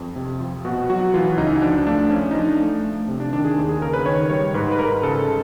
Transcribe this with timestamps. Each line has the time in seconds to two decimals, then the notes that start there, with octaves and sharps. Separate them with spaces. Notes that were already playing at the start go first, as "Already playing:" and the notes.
Already playing: F2
0.16 C3
0.40 F3
0.65 B2 F#4
0.90 F#3 F#4
1.14 E3 F4
1.37 C#2 D#4
1.62 F3 D4
1.87 A3 D4
2.10 F3 C#4
2.31 D#4
2.35 F3 D4
2.60 A3
2.83 A3
3.08 C3
3.20 D4
3.32 D#3 D4
3.44 G#4
3.58 D#2
3.69 G#4
3.81 C#3 A#4
3.93 B4
4.06 D#3 C#5
4.29 G3 C#5
4.54 G#2 B4
4.72 B4
4.79 G#2 A#4
5.03 C#3 A4
5.27 C#3